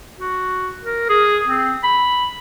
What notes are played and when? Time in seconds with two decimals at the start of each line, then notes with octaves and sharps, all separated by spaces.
0.19 F#4
0.83 A#4
1.09 G#4
1.47 C4
1.83 B5